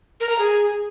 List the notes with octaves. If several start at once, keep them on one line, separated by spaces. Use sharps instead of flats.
A#4
A#5
G#4